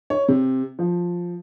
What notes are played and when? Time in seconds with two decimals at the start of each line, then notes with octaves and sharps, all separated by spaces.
0.10 C#5
0.28 C3
0.79 F3